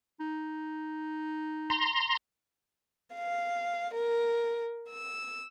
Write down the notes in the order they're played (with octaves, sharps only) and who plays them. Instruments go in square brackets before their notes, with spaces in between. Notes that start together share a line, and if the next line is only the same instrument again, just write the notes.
[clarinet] D#4
[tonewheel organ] A#5 C6
[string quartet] F5
A#4
E6